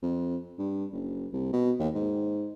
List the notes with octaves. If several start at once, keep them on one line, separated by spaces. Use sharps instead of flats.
F2
G2
F#1
C2
B2
D#2
G#2